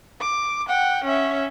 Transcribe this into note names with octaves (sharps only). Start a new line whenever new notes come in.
D6
F#5 G5
C#4 E5